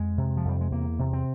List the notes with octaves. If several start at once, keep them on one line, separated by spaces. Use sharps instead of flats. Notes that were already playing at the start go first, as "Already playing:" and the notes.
Already playing: F2 G#3
C3
F3
F2 G3
G#3
E2 A#3
C3
C4